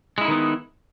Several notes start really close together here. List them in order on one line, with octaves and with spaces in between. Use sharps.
G#3 E4 D#4 D#3 B3